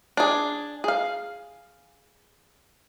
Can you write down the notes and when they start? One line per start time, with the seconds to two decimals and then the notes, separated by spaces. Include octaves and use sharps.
0.17 D4 G#4
0.84 G#4 F5